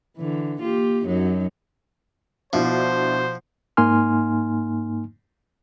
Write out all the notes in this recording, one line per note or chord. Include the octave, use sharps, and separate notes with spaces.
D3 E3
A#3 F4 G4
F#2 F#3 D#4
B2 F3 D4 E4 C5
G#2 A#3 D#4 G#5 C6 F6